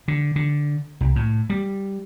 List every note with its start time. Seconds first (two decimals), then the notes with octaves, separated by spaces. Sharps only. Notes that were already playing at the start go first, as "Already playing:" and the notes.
0.08 D3
0.36 D3
1.01 C2
1.16 A2
1.50 G3